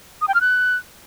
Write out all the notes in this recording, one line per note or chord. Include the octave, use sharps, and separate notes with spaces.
D#6
G5
F6
F#6